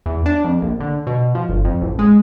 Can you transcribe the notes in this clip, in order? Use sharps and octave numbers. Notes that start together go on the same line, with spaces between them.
E2
D4
F2
A#1
D3
B2
F3
G1
F2
A1
G#3